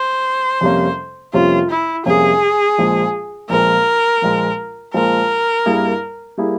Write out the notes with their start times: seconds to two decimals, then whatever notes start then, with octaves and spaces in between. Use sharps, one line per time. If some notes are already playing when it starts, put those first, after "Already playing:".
Already playing: C5
0.61 F2 C3 G3 A#3 C#4
1.33 F2 C3 G3 A#3 C#4 F4
1.70 E4
2.05 F2 C3 G3 A#3 C#4 G#4
2.78 A#1 A#2 F3 G#3
3.49 A#1 A#2 F3 G#3 A#4
4.22 A#1 A#2 F3 G#3
4.94 A#1 A#2 F3 G#3 A#4
5.66 G2 G3 A#3 E4 G#4
6.38 G3 A#3 E4 G#4